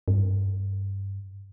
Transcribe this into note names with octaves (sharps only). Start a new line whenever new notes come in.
G2